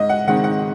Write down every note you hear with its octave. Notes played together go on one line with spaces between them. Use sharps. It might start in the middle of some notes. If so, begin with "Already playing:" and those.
Already playing: G#2 D#5
F#5
D#3 G#3 C4 F#5
F#5